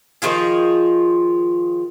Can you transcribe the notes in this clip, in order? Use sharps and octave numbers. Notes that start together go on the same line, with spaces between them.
D#3 F3 F4 G#4